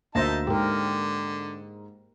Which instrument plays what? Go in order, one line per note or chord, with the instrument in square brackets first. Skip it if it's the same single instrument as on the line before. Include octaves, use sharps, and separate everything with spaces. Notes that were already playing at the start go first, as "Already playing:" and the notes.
[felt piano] D2 A#6 [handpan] A#3 C5 E5 [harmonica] D#4 A5
[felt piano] G#2 [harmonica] D3 [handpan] G4 A#4